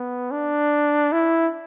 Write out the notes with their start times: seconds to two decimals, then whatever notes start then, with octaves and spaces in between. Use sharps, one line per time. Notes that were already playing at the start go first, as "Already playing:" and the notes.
Already playing: B3
0.31 D4
1.13 E4